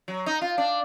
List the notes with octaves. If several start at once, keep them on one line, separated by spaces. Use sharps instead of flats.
F#3
D#4
F4
D4